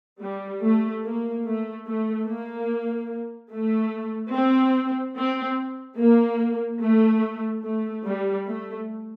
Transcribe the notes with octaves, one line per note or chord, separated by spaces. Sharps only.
G3
A3
A#3
A3
A3
A#3
A3
C4
C4
A#3
A3
A3
G3
A3